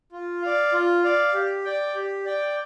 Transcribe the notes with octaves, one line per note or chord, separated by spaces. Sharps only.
F4
D5 F5
F4
D5 F5
G4
D5 G5
G4
D5 G5